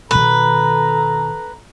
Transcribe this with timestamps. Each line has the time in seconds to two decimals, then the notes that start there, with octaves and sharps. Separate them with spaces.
0.11 B2 D#3 A4 B4 A#5